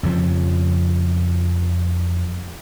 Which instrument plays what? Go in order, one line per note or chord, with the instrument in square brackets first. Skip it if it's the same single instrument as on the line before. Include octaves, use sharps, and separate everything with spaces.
[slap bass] F2 C#3 F3